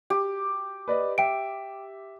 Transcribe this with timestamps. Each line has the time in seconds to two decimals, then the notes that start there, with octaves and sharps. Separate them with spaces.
0.10 G4
0.88 B4 D5 D#5
1.18 E5 G5 D7